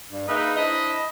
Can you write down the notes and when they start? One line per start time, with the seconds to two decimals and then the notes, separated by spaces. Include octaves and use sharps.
0.10 G2
0.28 A#3 D#4 G#4 B4 D#5 E5
0.56 D4 E4 C5 D#5